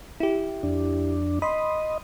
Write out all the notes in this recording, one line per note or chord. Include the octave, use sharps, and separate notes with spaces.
E4 G4
F2 D4
D#5 B5 C6